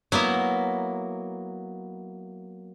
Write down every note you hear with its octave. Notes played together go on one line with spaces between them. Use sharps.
F#3 A#3 B3 E4